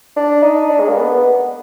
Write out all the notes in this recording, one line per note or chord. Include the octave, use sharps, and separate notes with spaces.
D4
D#4
D4
G#3
A#3
B3